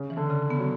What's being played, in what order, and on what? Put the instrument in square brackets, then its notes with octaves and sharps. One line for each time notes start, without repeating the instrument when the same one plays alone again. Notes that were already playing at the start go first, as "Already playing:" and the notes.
Already playing: [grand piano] C#3
[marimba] E3
[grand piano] D3
[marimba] C#3
B3
[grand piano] F#3